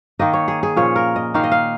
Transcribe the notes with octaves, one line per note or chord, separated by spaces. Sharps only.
D#3 A#3 D#4 D#5
C#5
G#4
G#4
A#2 F3 C#4 C#5
A#4
D#5
D#3 A#3 D#4 F5
D#5
F5